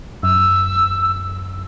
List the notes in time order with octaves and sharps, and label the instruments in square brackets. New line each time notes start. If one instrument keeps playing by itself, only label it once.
[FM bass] F#2 [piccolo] E6